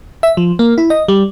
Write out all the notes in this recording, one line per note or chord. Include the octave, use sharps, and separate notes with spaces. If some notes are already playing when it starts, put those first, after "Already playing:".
E5
F3
A#3
E4
D#5
G3